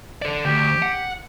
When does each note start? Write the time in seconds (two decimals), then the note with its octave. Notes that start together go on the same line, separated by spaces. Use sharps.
0.22 A4 D5
0.45 D2 G4
0.82 F#5